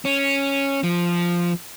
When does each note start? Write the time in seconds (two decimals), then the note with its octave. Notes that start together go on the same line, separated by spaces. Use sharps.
0.05 C#4
0.84 F3